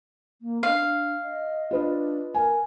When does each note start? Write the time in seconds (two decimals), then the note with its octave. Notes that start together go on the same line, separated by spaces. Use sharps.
0.41 A#3
0.63 D4 F5
1.22 D#5
1.71 D4 F4 B4 D#5
2.35 A#4 G#5